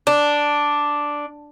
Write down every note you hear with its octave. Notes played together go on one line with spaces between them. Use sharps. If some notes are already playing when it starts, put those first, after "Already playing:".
D4